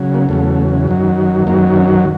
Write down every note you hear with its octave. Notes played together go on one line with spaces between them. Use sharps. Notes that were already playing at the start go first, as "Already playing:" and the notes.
Already playing: C#3 F#3
A#3
E2 C#3 F#3 A3
F#2 D#3 F#3
F#2 D#3 F#3 A#3
C#4